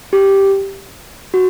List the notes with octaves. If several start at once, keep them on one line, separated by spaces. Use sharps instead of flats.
G4
F#4